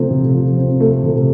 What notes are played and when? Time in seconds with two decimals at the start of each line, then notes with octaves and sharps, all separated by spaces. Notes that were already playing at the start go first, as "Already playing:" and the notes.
Already playing: C3 F3 A3 C4
0.11 C3
0.34 F3
0.57 C4
0.80 A3
1.03 C3